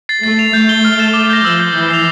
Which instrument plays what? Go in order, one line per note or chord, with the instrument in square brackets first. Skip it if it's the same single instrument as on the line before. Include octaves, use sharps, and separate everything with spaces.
[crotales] A6 C7
[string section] A3 [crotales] A6
[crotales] C7 F7
[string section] A3 [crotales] G6
[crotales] C7 G7
F6
A6 E7 G7
D6
G6 A#6
[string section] F3 [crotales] E6
[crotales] G6 C7
[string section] E3 [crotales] G6
[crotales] C7 F7